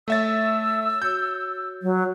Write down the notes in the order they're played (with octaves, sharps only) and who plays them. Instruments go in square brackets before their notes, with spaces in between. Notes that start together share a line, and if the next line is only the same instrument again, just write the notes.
[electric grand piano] A3 E5 A6 [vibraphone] C#5 [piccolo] E6
[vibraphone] F#4 C#5 [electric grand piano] G6
[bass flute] F#3